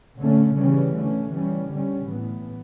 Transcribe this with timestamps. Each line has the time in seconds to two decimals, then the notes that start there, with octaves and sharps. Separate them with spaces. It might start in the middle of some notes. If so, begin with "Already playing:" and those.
0.20 D3 A3 C#4
0.58 C#3 E3 G3 C#4
0.96 D3 A3 C#4
1.33 E3 G3 C#4
1.72 D3 G3 C#4
2.10 A2 E3 B3